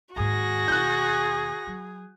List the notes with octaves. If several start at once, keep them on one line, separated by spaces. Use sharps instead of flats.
D#2 G#2 F#4 G#4 A#6
D#2 B2 F#6 G6
F#3